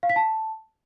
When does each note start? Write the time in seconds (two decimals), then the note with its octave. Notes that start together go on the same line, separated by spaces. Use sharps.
0.03 F5
0.09 B6
0.16 A5